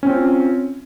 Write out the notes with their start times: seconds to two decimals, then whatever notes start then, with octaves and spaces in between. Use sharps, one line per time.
0.03 C#4
0.06 C4
0.10 F4